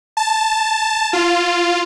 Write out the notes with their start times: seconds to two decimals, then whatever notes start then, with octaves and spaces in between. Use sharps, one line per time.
0.17 A5
1.13 F4